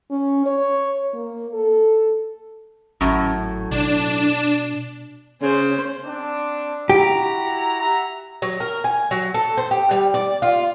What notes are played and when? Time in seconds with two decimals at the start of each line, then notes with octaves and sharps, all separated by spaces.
0.11 C#4
0.46 C#5
1.14 A#3
1.53 A4
3.01 G#1 F#2 A2
3.71 B2 D4 E7
5.42 C#3 C#4 C5
6.05 C4 D4
6.90 E4 F#4 G4 A#5
7.80 E5 F#5 A#5
8.42 F#3
8.60 A#4
8.84 G#5
9.11 F#3
9.34 A4
9.57 C5
9.71 G4
9.91 G3
10.14 D5
10.42 F4